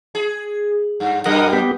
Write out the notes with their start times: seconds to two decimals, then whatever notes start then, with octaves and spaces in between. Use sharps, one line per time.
0.15 G#4
1.00 G2
1.26 F#2 B2 G3 A#4 D#5 F#5
1.53 B3 G4